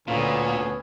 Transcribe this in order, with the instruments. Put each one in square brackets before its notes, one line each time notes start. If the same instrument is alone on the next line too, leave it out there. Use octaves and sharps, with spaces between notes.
[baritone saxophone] D2 [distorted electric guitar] A#2 [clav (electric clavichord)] D3 F4 [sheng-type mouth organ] B3 C#4